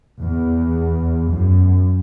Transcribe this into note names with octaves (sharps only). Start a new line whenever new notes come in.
E2
F#2